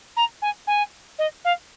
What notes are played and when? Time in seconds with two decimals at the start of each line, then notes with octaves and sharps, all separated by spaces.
0.16 A#5
0.42 G#5
0.67 G#5
1.18 D#5
1.45 F5